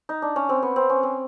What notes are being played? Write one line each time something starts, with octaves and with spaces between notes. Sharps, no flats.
D#4
D4
C#4
C4
B3
C4
C#4
C4